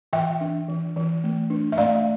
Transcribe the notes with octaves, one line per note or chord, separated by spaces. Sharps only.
E3 E5 G5
D4
E3
E3
A3
D4
E5
A3 D5 F5